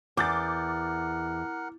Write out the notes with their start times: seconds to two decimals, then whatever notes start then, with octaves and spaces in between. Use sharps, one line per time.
0.17 E2 A#4 F#5 D6 G6 A6